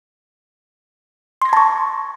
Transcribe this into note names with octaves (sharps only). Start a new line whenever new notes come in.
A5 C6 C#6 G#6 A#6